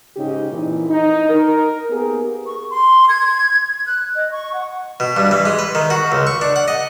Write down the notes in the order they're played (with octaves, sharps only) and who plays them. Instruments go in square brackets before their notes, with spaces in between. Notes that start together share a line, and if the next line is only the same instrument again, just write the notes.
[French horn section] G#2 C#3 D#4 G4
F2 A#2 E3
D#4
A#4
A#3 B3 G4 G#4 A#4
[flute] C#6
C6
G#6
F#6
D#5
C#6
F#5
[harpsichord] B2
G2
E3
G#3
B4
D#3
F#4
C#2
C#6
D4
F#5
D#5